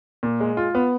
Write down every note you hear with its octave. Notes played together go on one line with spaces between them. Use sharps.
A#2
G#3
F4
B3